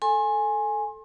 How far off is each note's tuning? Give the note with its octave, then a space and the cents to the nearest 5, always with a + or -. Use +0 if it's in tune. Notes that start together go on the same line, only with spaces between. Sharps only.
A4 +0 G#5 +0 C6 +35